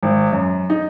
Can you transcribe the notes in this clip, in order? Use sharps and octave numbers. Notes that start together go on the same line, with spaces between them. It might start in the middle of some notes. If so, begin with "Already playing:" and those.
G#1
F#2
D#4